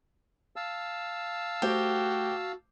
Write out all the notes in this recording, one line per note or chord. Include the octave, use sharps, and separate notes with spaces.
F5 A5 E6
A3 F#4 G4 C5 G5